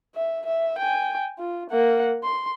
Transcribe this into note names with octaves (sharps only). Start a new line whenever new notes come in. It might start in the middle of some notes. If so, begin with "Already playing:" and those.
E5
E5
G5 G#5
F4
A#3 F#5
C6